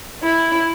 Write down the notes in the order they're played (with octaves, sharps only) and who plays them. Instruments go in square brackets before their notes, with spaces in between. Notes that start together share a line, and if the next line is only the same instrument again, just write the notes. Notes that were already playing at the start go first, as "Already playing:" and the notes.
[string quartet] E4